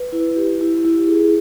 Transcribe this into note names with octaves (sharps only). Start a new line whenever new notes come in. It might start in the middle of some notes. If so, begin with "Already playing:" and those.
Already playing: B4
E4
G4
E4
E4
G#4